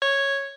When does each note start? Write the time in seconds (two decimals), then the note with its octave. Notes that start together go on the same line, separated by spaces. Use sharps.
0.02 C#5